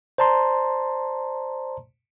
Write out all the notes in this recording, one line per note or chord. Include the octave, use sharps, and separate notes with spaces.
C5 D5 A5 A#5 C6